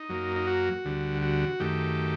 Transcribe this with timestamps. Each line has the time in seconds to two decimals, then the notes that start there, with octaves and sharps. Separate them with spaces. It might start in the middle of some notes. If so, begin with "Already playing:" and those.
Already playing: D#4
0.09 F#2 F#3 A#3
0.36 D#4
0.47 F#4
0.85 D2 D3 G3
1.22 F#4
1.60 F#2 D#3 A3 G4